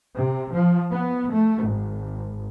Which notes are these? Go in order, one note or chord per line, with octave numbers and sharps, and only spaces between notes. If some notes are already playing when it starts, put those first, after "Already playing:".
C3
F3
B3
A3
G#1